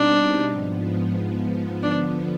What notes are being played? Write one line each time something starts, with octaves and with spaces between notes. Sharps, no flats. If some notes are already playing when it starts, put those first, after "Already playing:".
Already playing: B2 G3 C4 D4 D#4
G#2 F3 B3
D3 F3 B3 D4